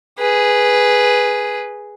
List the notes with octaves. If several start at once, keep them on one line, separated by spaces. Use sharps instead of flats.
G#4 B4